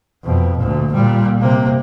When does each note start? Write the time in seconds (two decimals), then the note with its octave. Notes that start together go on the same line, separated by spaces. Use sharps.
0.24 F2 B2
0.57 D2 A#2
0.93 A#2 G3
1.40 C3 A#3